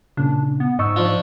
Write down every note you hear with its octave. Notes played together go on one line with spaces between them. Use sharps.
A#2 C#3 D4
B3
G#2 D#5 C#6 E6
F3 D4 F4